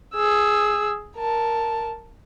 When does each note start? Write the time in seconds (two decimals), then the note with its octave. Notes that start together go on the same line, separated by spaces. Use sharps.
0.14 G#4 E6
1.17 A#4 A5